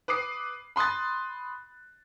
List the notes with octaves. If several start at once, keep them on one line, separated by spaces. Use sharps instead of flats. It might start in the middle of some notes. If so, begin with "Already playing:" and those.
B4 D6 D#6 C7
B5 C6 D#6 F#6 A6